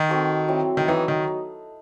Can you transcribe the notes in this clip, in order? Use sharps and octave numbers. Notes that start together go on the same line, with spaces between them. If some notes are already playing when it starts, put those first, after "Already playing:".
Already playing: D#3 D#4
C4 F#4 A4 C5
F#3 C4 E4
D#3
E3 F#3 B3 D#4
D#3